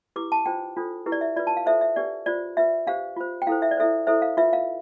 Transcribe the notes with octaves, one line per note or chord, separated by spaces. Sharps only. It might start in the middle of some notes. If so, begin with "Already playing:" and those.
E4 G4 B4 D6
A5
D4 F4 C5 G5
D4 F4 A4 C5
E4 G4 B4
D5
E5
F4 B4 D5
A5
F5
F4 A4 C5 E5
E5
D4 G4 B4 D5
F4 C5 D5
F4 B4 E5
D4 G4 C5 F5
F4 C5
G5
E4 A4 C5 F5
E5
D5
E4 A4 C5 E5
E4 A4 C5 E5
F5
F4 B4 E5
F5